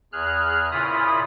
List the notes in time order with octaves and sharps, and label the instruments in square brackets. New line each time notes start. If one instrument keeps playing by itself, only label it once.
[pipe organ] E2 G#4 F6 F#6
A#2 C#3 E4 F4 B5 D#6